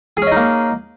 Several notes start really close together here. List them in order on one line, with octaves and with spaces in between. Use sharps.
G#4 C#4 D#5 D#4 A#3